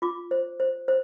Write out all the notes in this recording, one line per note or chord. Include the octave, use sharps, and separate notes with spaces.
F4 D6
C5
C5
C5